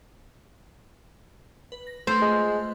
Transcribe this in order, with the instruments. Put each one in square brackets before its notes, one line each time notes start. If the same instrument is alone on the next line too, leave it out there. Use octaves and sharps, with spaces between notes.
[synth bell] B4
A#6
[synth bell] A3 F4 B4 [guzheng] C5
[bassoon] G#3